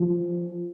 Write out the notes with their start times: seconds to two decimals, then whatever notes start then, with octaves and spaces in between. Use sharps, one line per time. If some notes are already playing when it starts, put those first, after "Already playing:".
Already playing: F3